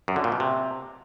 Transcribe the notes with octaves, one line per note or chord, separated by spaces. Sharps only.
F#2
D3
A#2
B2
C3